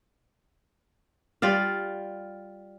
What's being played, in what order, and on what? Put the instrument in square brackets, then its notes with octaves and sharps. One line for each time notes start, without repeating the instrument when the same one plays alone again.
[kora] G3 F4 D5 F5